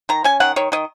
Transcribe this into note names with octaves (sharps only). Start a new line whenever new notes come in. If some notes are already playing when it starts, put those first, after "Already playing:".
D#3 A#5
C#4 G#5
D#3 F#5
D#3 C#5
D#3 D#5